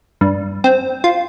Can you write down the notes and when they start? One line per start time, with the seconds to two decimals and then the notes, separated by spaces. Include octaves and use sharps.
0.21 G2
0.64 C4
1.04 F4